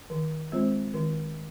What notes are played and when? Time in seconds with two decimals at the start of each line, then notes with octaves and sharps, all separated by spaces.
0.10 D#3
0.52 G#3 C4 F4 C5
0.94 D#3